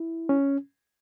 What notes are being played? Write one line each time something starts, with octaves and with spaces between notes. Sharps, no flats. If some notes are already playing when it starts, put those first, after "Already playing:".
Already playing: E4
C#4